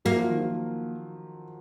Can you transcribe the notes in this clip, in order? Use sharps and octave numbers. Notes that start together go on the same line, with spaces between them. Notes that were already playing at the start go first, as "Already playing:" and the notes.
F#3 A#3
F3
D#3
F3